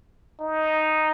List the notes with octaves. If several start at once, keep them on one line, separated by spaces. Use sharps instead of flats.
D#4